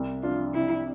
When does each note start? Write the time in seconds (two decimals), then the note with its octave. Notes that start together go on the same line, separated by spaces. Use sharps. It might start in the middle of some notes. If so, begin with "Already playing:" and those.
Already playing: C2
0.23 D4 F4
0.54 C3 E4